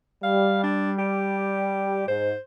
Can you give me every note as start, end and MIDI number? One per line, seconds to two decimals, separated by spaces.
0.23 2.03 55
0.23 0.62 77
0.63 0.91 62
0.99 2.07 67
2.08 2.32 44
2.08 2.38 72